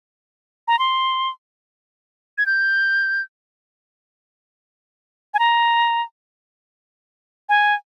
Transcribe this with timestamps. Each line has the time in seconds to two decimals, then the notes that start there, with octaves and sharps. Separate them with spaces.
0.68 A#5
0.79 C6
2.38 G#6
2.46 G6
5.34 G#5
5.39 A#5
7.49 G#5